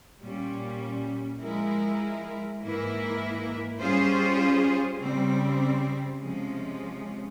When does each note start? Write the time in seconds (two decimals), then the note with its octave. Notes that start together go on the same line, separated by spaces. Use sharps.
0.22 A#2 G3 C#4
1.41 F3 G#3 E4 A#4
2.61 G#2 E3 A#3 E4 A#4
3.80 G3 C#4 F4 G#4 C5
5.00 C#3 G3 C4
6.20 C3 F3 G#3 C#4